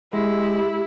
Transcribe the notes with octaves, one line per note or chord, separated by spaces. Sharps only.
G#3 E4 G4